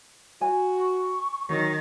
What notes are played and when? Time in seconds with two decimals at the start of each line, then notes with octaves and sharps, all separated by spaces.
0.41 F#4 G#5
0.78 C#6
1.49 D#3 F#3